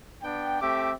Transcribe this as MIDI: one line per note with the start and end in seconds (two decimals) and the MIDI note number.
0.23 0.57 59
0.23 0.57 62
0.23 0.57 79
0.61 0.93 57
0.61 0.93 60
0.61 0.93 67
0.61 0.93 76
0.61 0.93 86